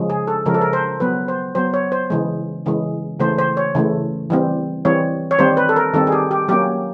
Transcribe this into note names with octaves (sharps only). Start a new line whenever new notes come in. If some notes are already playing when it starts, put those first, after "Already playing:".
Already playing: C#3 F3 G#3
G#4
A4
C#3 F3 G#3 A#4
A4
A#4
C5
F#3 B3 B4
C5
F#3 B3 C5
C#5
C5
C#3 E3 G#3
C#3 E3 G#3
C#3 E3 A3 C5
C5
C#5
C#3 E3 A3
E3 G3 C4
E3 G3 C4 C#5
C#5
D#3 G3 C4 C5
B4
A4
A#4
D#3 G3 C4 A4
G#4
G4
G4
F#3 A#3 C#4 G4